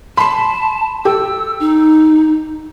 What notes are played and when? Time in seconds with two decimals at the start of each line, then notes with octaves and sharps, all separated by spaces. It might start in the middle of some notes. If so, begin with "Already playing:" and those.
0.17 A5 B5 C6
1.05 G4 A4 E6
1.60 D#4